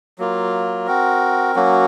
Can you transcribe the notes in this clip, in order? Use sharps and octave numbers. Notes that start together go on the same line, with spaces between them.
F#3 A#3 F4
C4 F#4 A#4
F#3 A#3 C#4 F#4